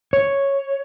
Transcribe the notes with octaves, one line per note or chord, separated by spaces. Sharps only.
C#5